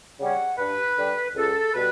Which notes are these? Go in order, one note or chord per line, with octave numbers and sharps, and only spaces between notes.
C#3 G3 C#4 F#5
G2 B4
D3 G3
C#2 A4
B2 G3 B4